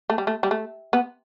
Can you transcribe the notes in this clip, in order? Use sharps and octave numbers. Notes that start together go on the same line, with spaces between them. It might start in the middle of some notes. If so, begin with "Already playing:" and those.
A3
G3
A3
G3
A3
B3